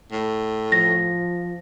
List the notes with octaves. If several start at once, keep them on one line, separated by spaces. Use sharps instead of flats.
A2
F3 A#6